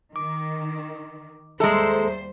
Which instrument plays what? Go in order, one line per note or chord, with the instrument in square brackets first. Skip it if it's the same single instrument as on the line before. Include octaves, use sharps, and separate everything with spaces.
[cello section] D#3 [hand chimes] D6
[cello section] D#2 G3 C5 [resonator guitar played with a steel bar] G#3 A4 [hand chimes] G#4 E5 A#5